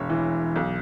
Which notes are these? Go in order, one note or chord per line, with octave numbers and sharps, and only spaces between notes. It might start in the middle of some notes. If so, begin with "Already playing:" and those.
Already playing: E1 C#5
E3
B1